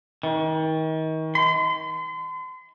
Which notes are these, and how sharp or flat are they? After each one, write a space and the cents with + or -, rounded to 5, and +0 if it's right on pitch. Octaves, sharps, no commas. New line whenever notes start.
D#3 +35
C6 -40